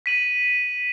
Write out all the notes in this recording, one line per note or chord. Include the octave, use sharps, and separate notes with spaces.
B6 D#7 F#7